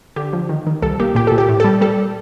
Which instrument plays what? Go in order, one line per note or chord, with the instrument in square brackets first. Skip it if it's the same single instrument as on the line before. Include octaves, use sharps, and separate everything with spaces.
[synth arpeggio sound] D3 G4
F3
D#3
D#3
C2 A4
A#3 G4
A#2 G4
A#2 A4
G4
A2
G3 A4
G3 A4